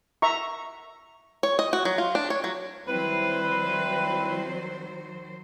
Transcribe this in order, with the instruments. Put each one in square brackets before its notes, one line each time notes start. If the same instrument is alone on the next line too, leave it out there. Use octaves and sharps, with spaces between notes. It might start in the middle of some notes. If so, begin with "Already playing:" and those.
[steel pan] E5 A#5 C#6
[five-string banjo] C#5
D#5
F#4
F#3
F4
D4
C#5
F#3
[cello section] D#3 F#3 C5 [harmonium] G3 C4 E4 [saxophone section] B4